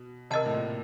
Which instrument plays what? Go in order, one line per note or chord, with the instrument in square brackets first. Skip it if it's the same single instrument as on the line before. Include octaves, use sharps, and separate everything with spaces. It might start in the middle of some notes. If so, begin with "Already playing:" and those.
Already playing: [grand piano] B2
[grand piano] C3 [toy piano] A#4 D#5 F#5 A5
[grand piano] A2
A#2